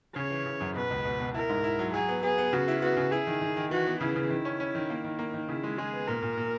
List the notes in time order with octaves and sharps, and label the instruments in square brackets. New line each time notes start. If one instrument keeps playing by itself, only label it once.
[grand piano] C#3 [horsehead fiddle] C#5
[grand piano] E3
C#3
F#2
[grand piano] B2 [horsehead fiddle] B4
[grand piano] C#2
B2
B2
[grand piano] E4 [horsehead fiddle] A#4
[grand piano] G#2
E4
F#3
[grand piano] F#3 [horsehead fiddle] G#4
[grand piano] B3
[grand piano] B3 [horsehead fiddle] G#4
[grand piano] B3
[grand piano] C#3 [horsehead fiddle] F#4
[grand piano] E4
[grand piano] B3 [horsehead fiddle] F#4
[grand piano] C#3
[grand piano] E4 [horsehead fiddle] G#4
[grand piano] D#3
D#3
D#3
[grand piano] E3 [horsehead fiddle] F#4
[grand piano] B3
[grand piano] C#3 [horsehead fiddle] E4
[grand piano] C#3
D#3
C#4
C#4
D#3
A#3
D#3
A#3
D#3
[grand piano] C#3 [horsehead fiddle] E4
[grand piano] G#3
[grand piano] G#3 [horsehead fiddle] G#4
[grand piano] B3
[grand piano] A#2 [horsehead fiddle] A#4
[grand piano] A#2
A#2